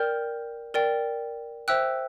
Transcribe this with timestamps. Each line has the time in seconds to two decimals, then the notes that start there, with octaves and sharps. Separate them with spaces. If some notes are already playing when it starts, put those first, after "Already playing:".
Already playing: A#4 D5 G5 F6 G6
0.74 A#4 D5 G5
1.68 C5 E5 G5 E6 F#6